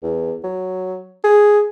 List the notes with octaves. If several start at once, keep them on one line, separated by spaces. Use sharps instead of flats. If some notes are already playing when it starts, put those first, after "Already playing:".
E2
F#3
G#4